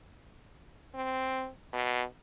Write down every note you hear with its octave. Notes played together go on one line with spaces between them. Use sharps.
C4
B2